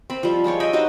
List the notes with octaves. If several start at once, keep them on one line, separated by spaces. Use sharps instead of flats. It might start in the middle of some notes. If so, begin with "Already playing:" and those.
C4 B5
F3 G3
G#3 F4 G4 C#5
D#5 E5 G5 B5
D#4 F#4 G4 C5